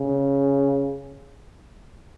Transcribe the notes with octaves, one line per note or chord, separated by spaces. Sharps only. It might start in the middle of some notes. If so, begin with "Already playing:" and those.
Already playing: C#3